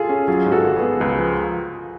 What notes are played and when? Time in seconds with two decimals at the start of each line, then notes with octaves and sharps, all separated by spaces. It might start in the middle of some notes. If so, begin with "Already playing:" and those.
Already playing: F4 G#4 A4
0.09 C#4
0.28 F#3 F4 G#4
0.46 G#2
0.52 F#4 A4
0.64 G#1
0.76 G#4 B4
0.82 B3
1.00 C#2 G#4 B4
1.19 F3